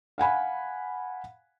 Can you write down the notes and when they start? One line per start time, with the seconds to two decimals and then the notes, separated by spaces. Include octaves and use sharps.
0.18 F5 F#5 G#5 B5